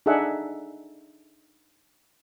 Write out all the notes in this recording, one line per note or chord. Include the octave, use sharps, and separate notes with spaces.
D4 D#4 G#4 A4 E5 F#5